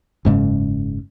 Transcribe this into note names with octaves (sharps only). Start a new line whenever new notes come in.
F#1 G#2 C#3